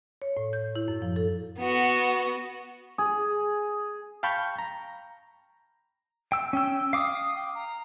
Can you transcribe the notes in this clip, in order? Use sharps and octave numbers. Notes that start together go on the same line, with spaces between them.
C#5
A2
G6
E4
F#2
F3
A4
B3 F#4
G#4
F5 G5 A5 B5 C#6 G6
A#5
G5 E6
C#4 G5 E6
F5 D6 D#6
G5
A#5